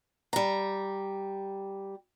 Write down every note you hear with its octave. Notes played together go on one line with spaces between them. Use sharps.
G3 A#5